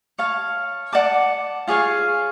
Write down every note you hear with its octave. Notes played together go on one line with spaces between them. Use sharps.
C#5 F5 A5
D5 F#5 A5 D6
F4 G#4 C#5 F5